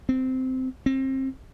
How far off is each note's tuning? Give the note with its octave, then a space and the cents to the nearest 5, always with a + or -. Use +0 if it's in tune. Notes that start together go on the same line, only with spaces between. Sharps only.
C4 -15
C4 +30